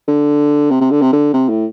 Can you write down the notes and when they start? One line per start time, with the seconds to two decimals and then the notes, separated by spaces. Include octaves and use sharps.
0.08 D3
0.71 C3
0.81 C3
0.91 D3
1.02 C3
1.13 D3
1.33 C3
1.49 A2